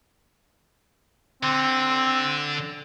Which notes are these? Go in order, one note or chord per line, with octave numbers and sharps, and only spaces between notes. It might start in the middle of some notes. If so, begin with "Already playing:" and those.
D3 C4